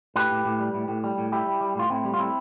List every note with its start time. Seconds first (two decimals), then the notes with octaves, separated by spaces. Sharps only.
0.16 A2 G4 B4
0.31 A2
0.45 A2
0.60 G3
0.74 A2
0.88 A2
1.04 G3
1.18 A2
1.32 G3 E4 G4
1.47 G3
1.61 G3
1.75 A2 F4
1.90 A2 C4 E4
2.05 G3
2.14 F4
2.19 A2 C4 E4